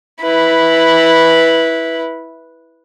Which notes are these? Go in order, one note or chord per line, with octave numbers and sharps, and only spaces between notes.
E4 B4